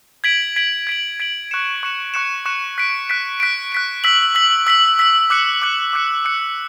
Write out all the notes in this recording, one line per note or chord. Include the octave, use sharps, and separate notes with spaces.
G#6 B6 D7 F#7
G#6 B6 D7 F#7
G#6 B6 D7 F#7
G#6 B6 D7 F#7
C#6 F#6 C#7 E7
C#6 F#6 C#7 E7
C#6 F#6 C#7 E7
C#6 F#6 C#7 E7
F#6 B6 D7
F#6 B6 D7
F#6 B6 D7
F#6 B6 D7
E6 B6 F#7
E6 B6 F#7
E6 B6 F#7
E6 B6 F#7
D6 F#6 C#7
D6 F#6 C#7
D6 F#6 C#7
D6 F#6 C#7